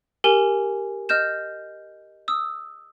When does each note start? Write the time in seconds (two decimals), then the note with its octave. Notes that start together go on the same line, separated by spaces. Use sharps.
0.24 G4 A#4 G#5 G7
1.09 D#5 F6 G6 E7
2.28 D#6 E6